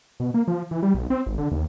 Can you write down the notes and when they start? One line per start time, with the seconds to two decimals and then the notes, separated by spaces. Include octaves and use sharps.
0.20 B2
0.34 A#3
0.48 F3
0.71 E3
0.83 G3
0.94 B1
1.10 C4
1.26 G#1
1.38 D3
1.51 D#2